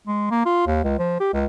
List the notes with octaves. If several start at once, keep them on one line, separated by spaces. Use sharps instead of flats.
G#3
A#3
F4
D#2
C#2
F3
G4
C#2